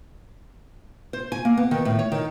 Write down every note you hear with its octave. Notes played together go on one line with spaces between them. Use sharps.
C5
G#5
A#3
B3
D#3
A2
C#5
D#3